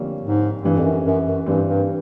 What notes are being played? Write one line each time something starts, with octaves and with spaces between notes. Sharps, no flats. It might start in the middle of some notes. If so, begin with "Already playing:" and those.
Already playing: F2 D3 G3 A#3 C#4
G#2
G2 E3 G3 C4
F2
F#2
F#2
F#2
G2 E3 G3 C4
G2